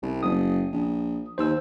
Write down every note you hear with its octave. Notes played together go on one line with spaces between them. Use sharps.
C2
F#1 D#6
A#1
D#2 C5 E6